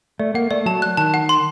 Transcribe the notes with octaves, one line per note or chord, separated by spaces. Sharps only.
A3 D5
A#3 F#5
A3 D5
F#3 A5
F#6
D#3 A5
F#5
C6